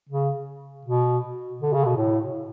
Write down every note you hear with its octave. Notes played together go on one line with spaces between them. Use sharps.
C#3
B2
D3
C#3
B2
A2